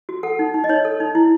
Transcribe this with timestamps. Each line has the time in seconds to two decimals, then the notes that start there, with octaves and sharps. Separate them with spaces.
0.09 F#4
0.23 A4 F#5
0.39 D#4
0.54 D#4
0.64 D#5
0.69 D#4 C#5
0.85 A4
1.00 D#4
1.15 E4